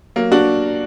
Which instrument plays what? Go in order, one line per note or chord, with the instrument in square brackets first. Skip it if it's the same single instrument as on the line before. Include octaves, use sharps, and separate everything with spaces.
[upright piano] F#3 A#3
D4 F#4